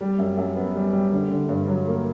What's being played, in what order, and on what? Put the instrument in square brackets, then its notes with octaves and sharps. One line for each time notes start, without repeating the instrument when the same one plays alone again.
[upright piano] G3
F#2
F#2
B3
G3
G3
D3
D3
G2
F#3
A#3